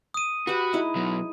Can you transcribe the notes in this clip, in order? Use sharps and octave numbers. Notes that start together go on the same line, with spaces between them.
D#6 D#7
F#4 G4 B4
G#3 D#4 E4
B2 F#3